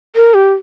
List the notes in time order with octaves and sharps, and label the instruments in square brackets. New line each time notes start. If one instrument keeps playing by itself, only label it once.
[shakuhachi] A#4
G4